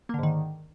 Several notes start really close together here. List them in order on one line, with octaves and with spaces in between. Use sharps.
A#3 D3 G#2 D#3